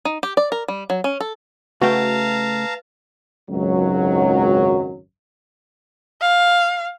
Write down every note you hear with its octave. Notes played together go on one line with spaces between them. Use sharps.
D#4
G4
D5
A#4
G3
F#3
C#4
A4
C#3 A3 F#4 B4 F5 G5 A5 A#5
G#1 C#2 F#2 D#3 F#3
F5